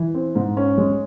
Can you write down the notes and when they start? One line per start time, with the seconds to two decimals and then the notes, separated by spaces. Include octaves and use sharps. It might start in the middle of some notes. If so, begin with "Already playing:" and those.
Already playing: E3
0.14 C4
0.35 G#2
0.57 C#4
0.78 G#3